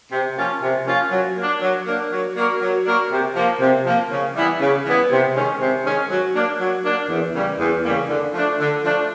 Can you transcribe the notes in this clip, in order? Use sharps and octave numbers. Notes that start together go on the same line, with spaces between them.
C3
F3 A#3 C#4 F4
C3
F3 A#3 C#4 F4
F#3
A#3 D4
F#3
A#3 D4
F#3
A#3 D4 F#4 A#4
F#3
A#3 D4 F#4 A#4
C3
F3 A#3
C3
F3 A#3
C#3
E3 G3 B3 E4
C#3
E3 G3 B3 E4
C3
D#3 G#3 C#4
C3
D#3 G#3 C#4
F#3
A#3 D4
F#3
A#3 D4
E2
C#3 E3 G3 A#3
E2
C#3 E3 G3 A#3
D3
F3 A3 D4
D3
F3 A3 D4